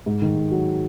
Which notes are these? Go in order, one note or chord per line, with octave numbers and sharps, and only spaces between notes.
G#2
D#3
G#2
F#3